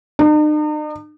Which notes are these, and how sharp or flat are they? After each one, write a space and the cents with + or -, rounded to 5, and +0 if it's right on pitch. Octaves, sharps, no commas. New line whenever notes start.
D#4 -45